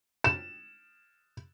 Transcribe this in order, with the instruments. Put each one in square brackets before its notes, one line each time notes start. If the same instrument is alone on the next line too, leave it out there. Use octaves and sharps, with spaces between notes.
[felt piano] E7